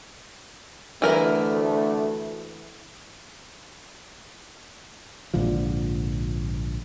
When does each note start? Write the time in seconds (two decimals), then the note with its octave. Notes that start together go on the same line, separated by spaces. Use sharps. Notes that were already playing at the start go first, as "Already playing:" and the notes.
1.02 D2 E3 A3 A#4 A#5
5.34 A#1 G#2 D3 F3